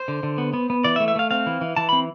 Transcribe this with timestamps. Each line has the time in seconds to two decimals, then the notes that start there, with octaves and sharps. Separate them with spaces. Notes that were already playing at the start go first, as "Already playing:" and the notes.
Already playing: C5
0.08 D3
0.23 D3
0.38 B3
0.53 B3
0.70 B3
0.84 E3 D5
0.96 E5
1.00 A3
1.08 E5
1.15 A3 F5
1.31 C4 F5
1.46 E3
1.61 E3
1.76 E3 A5
1.89 C4 B5